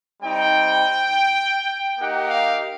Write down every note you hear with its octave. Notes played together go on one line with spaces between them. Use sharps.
G3 C4 D#4 G5
A#3 D#4 G4 F#5
F5